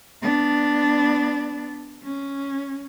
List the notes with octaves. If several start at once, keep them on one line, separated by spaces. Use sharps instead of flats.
B3 D4
C#4